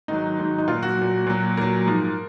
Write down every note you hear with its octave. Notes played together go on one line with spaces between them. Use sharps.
G#2 D#3 F#3 D#4
G#2 D#3 F#3
D#4
A#2 F#3 F4
F#4
A#2 F#3
A#2 F#3
A#2 F#3 A#4
G#2 F3